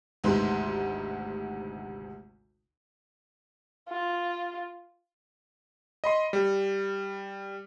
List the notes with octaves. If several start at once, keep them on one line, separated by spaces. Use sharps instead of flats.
G#1 D2 C3 D#4 B4 C6
F4
D#5 B5 C6
G3